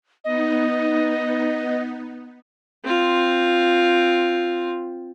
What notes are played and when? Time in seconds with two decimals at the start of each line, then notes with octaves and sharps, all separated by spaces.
0.24 B3 D#4 D#5
2.84 C4 F4